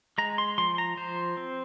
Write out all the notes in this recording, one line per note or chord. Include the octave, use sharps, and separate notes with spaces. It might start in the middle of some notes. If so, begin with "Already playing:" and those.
G#3 A#5
C6
F3 C6
A#5
F3 C5
C4